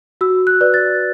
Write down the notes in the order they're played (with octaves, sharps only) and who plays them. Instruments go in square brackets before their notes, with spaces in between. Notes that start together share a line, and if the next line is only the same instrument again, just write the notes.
[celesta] F#4 E6
F#6
B4 D5
A6